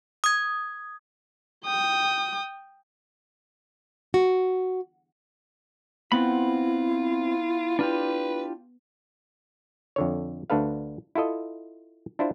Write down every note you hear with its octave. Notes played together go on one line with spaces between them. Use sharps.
D#6 G#6
G5 D#6
F#4
B3 C4 E4 F4 B5
D4 F4 G4 B4
F2 D3 C#5
D2 D4 A4 B4 F5
E4 F4 A4 D#5
D4 E4 F4 C5